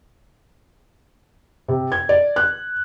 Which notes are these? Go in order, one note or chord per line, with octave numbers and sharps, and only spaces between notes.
C3
G#6
D5
F#6